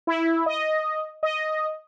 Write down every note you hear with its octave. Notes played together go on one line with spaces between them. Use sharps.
E4
D#5
D#5